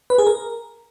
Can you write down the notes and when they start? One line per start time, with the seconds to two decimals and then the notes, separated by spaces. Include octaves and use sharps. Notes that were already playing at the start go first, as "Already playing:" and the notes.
0.10 B4
0.18 G#4
0.27 A#4